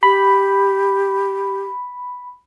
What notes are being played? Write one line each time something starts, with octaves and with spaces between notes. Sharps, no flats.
G4 B5